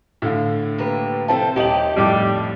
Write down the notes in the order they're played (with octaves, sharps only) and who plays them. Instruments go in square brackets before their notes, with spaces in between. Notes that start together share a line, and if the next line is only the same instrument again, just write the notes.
[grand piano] A2 D3 F5
[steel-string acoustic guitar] A#3 G4 B4
[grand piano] C3 C4 E4 [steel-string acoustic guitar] F3 A4 C5 [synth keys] A5
[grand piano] D#1 F#7 [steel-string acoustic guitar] C3 D#4 [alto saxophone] G4
[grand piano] F2 A2 D6 [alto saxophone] G3